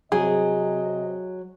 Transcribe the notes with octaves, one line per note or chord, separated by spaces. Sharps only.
C3 F#3 G#4 D#5